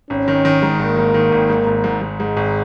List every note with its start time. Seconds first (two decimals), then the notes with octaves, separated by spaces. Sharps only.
0.10 G#1 C#4
0.28 D#3
0.45 D#3
0.62 G#2
0.79 G#1 A#3
0.97 G#2
1.14 D#3
1.32 G#1
1.49 G#2
1.66 G#1
1.84 G#2
2.01 G#2
2.20 G#2 G#3
2.37 G#1